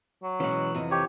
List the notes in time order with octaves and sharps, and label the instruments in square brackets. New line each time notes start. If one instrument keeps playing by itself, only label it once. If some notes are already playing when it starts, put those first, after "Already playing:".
[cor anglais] F#3
[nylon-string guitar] B2 G#3 C#4 [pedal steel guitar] E3 F#5
[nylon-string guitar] F2 C3 D#5
[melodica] G4 C#5